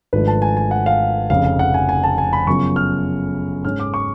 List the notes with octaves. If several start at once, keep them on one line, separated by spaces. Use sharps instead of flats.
G#1 G#2 F3 A3 D4 B4
A5
G#5
G#5
F#5
F5
F1 F2 C#3 F5
F5
F#5
G#5
G#5
A5
G#5
B5
F#2 C#3 F3 B3 C#6
F6
G#2 G#3 C#4 F6
D6
C#6